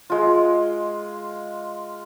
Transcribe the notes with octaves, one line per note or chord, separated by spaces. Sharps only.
G#3 F4